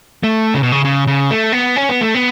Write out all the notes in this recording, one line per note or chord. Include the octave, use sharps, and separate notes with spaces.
A3
C#3
B2
C#3
C#3
C#3
A3
B3
C#4
B3
A3
B3